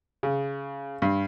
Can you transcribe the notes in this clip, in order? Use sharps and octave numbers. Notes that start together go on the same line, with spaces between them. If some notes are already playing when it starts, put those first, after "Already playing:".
C#3
G2